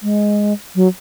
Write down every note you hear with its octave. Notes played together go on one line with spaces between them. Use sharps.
G#3
F#3